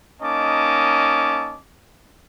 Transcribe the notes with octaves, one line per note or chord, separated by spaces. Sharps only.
A#3 C#4 D#4 D#5 A5 D6